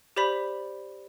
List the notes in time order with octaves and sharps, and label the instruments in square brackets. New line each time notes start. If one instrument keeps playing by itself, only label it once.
[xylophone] G4 C5 D5 B5 B6